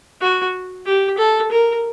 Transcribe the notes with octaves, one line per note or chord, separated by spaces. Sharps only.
F#4
G4
A4
A#4